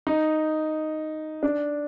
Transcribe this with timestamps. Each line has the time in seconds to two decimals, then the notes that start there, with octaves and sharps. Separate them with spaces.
0.07 D#4
1.43 D4